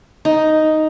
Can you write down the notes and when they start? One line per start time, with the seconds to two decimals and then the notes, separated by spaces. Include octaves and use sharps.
0.25 D#4